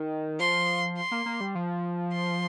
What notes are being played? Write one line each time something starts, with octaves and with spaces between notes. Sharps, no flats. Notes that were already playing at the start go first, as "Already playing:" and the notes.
Already playing: D#3
F3 C6
C6
A#3
A#3
G3
F3
C6